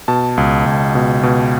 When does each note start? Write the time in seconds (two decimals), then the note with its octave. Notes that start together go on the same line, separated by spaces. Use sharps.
0.08 B2 A5
0.37 C#2
0.66 C#2
0.95 B2
1.23 B2